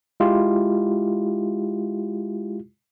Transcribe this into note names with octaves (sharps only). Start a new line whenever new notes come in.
G#3 E4 F4 G4